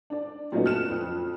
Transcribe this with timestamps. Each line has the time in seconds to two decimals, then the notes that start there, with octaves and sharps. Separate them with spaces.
0.10 D4 D5
0.52 A#2 F#3 A3 B3 C#4 D#4
0.66 F6 F#6 C#7 E7
0.90 F2